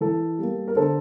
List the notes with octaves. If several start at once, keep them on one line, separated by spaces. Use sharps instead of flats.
E3 A4
G3 A#3
A#4
D3 A4 C5